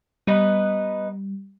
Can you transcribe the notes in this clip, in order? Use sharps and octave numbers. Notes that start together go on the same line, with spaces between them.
G3 B3 D#4 B4